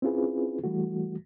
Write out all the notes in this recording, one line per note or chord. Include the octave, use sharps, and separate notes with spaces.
C4 C#4 E4 F4 G#4 B4
E3 G3 A3 F#4